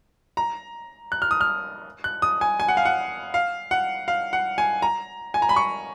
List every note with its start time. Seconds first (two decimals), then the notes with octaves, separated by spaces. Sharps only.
0.37 A#5
1.12 F#6
1.22 F6
1.31 D#6
1.41 F6
2.04 F#6
2.22 D#6
2.41 G#5
2.60 G#5
2.68 F#5
2.77 F5
2.85 F#5
3.34 F5
3.71 F#5
4.08 F5
4.33 F#5
4.58 G#5
4.82 A#5
5.34 G#5
5.42 A#5
5.49 B5
5.56 C#6